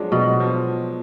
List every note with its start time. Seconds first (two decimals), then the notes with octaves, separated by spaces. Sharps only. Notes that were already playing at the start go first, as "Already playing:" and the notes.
Already playing: F3 F#3 G#3 D4
0.12 B2 F#3
0.40 F3